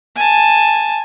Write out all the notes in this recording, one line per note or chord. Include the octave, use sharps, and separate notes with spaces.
G#5 A5